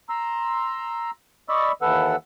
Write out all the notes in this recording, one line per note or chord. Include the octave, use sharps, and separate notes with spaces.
A#5 C6 E6
D5 D#5 B5 C#6 E6
D#2 E3 A4 B4 F#5 E6